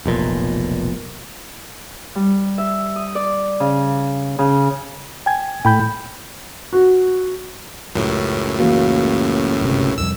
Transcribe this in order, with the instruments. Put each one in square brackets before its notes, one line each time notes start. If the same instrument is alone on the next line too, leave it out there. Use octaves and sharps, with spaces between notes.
[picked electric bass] F1 B1 A#2
[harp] G3
E5
D#6
D5
C#3
C#3
[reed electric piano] G5 G#5 G#6
[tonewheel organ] A2 [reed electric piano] G5 B5 G6
[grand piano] F#4
[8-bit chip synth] C#2 F#2 A2
[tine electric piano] E3 A#3 F#4
G1 C3
[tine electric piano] C2 F2 [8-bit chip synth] E6